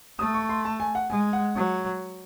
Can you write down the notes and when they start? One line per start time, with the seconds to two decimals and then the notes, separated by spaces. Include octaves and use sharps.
0.19 A3 D#6
0.34 C#6
0.49 C6
0.65 A5
0.80 G#5
0.95 F#5
1.10 G#3 G#5
1.33 F#5
1.56 F#3